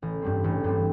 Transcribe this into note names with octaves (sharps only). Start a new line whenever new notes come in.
A1
G2 G3 C4
A1
G2 G3 C4